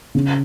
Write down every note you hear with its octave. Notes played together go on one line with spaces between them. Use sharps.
C#3